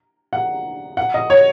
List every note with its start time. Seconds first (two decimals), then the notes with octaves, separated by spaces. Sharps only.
0.33 F#5
0.97 F#5
1.14 D#5
1.30 C#5